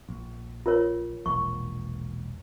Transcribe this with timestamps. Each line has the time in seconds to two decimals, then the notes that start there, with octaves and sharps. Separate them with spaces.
0.09 A#1
0.66 F4 A#4 C#5
1.26 E1 A#1 C#6